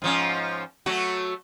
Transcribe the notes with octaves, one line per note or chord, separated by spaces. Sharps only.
G#2 F3 C#4
F#3 A3 F#4